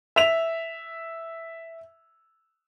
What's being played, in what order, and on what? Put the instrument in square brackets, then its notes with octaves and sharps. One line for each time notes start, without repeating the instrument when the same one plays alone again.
[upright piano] E5 F7